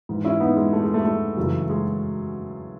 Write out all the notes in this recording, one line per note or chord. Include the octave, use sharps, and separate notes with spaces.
G#2 E3
C#4 E4
B3 D#4
G#3
A3
G#3
A3
A3
F#2 C#3 E3
G#3